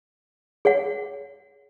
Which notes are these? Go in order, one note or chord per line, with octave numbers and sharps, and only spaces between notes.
G#4 C#5 F#5